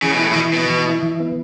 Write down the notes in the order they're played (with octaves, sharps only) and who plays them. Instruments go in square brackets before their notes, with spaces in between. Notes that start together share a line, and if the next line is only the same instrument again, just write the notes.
[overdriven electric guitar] C#3 [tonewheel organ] E3
[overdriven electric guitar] B2
[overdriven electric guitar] A2 [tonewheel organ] E4
[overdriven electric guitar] B2
[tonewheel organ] E3
[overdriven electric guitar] B2 [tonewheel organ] B3
[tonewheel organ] E3
E4
E3
B3